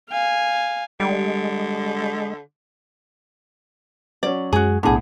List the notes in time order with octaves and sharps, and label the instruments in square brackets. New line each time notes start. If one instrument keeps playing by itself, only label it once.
[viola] F5 G#5
[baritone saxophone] D3 [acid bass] G3 [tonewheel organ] G#3
[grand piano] F#3 C#4 [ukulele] D5
[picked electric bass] F#2 G#3 [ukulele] F#4 G#4
[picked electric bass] B1 B3 [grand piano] A2 F#5 [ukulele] D4 G#4